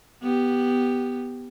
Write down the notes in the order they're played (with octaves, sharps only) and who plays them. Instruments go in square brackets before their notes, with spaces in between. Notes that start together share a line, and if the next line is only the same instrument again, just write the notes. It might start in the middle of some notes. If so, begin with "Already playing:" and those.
[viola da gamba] B3 G4